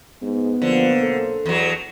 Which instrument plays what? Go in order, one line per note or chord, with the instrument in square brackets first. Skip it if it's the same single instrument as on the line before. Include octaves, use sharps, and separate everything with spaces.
[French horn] G#2 [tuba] B3
[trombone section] B1 A#3 C5 [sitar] D3 [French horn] F3
[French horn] A4
[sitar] E2 F#3